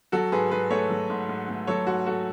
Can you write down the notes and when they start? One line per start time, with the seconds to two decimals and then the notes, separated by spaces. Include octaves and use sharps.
0.12 F#3 F#4 A4
0.32 G#2 G#4 B4
0.51 G#2 G#4 B4
0.70 A3 A4 C#5
0.90 F#3
1.10 G#2
1.29 G#2
1.49 A3
1.67 F#3 A4 C#5
1.87 G#2 F#4
2.06 G#2 F#4 A4